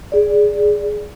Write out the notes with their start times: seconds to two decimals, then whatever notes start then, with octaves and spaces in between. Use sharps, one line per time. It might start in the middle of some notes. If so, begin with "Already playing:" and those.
0.12 G#4 D5